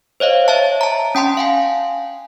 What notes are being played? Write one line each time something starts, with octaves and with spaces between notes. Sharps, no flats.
C5 C#5 D#5 F5
C#5 E5 A5
A5 A#5
C#4 G5 A5 C6
F5 F#5 G#5